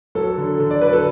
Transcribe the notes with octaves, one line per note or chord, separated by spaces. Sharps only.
F#3 A4
D3
D3
D5
F#3 B4
A4